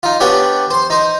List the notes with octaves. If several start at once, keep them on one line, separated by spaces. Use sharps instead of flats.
D#4 F4
B3 C#4 D4 G4 F#5 G5
C5 C6
D#4 C5